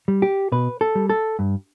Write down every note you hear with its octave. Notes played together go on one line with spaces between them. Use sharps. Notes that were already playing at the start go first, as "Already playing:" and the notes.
G3
G4
B2 B4
A4
G3
A4
G2